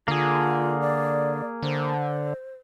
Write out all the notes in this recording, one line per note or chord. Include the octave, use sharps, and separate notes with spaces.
D3 A#3 F4 G#4
D5
D3 C5